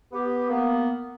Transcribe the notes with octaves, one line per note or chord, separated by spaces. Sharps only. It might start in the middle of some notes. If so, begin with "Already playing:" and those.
B3 G4
A#3 B3